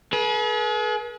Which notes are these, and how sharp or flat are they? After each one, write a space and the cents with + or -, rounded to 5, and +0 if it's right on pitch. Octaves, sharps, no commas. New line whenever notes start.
G#4 +40 B4 -40